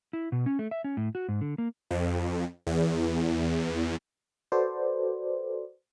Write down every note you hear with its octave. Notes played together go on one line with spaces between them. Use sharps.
E4
B2
C#4
A3
E5
C#4
A2
F#4
G#2
D3
A#3
F2
E2
F#4 A4 B4 C5 D5